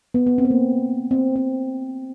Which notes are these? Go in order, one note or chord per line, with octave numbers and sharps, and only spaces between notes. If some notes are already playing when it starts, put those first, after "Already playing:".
B3
B3
C4
B3
A#3
C4
C4